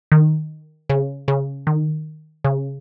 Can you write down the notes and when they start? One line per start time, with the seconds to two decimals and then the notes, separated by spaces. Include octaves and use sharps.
0.12 D#3
0.90 C#3
1.28 C#3
1.67 D#3
2.44 C#3